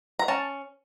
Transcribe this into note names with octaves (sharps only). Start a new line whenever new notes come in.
A#5
C#4 A5